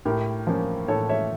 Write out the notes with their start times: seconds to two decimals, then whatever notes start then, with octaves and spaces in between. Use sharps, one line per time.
0.05 A2 G4 A#4
0.47 F3 A#3 C#4
0.88 A2 A4 C#5
1.09 C#5 E5